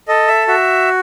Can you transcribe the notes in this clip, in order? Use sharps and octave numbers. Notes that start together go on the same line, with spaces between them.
A4 D#5
E5
F#4 E5